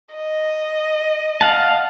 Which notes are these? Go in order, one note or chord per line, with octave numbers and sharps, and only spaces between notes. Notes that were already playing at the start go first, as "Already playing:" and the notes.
D#5
F5 F#5 A5